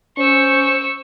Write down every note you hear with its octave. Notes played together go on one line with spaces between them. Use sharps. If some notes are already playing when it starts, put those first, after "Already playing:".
C#4 C5 C#6 E6